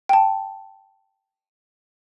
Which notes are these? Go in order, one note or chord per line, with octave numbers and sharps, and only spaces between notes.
G5 A5